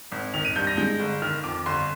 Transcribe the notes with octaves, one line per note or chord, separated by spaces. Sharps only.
G#1
D#3 F7
D#7
G2 G6
A#6
G#3 G6
G1
D#3 F6
F2 D6
G1 C6